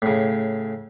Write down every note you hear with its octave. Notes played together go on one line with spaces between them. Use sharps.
A2 C#3